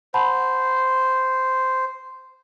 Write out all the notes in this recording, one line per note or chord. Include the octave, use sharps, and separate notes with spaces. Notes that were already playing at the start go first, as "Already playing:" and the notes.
C5 F#5 A5 B5